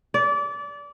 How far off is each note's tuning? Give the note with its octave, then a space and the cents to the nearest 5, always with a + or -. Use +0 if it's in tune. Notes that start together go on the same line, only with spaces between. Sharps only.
D5 -25